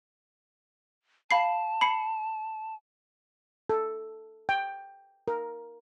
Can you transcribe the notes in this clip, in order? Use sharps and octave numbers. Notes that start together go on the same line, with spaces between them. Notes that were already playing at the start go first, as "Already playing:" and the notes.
F5 A5 B5 C7
B5 C7 C#7
A4
G5
A#4